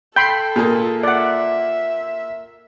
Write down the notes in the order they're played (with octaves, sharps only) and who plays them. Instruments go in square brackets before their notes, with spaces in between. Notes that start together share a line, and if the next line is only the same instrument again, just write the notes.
[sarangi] A4 [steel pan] G5 B5 C6 [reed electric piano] G6
[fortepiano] A#2 A#3 [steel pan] G#4
[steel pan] D5 F#5 [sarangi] E5